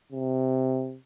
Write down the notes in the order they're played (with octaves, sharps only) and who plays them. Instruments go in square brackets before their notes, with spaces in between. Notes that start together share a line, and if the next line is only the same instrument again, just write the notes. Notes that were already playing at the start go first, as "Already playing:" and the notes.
[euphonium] C3